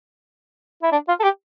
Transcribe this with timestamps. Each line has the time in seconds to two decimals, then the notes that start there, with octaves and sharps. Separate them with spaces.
0.82 E4
0.92 D4
1.08 F4
1.20 A4
1.23 G4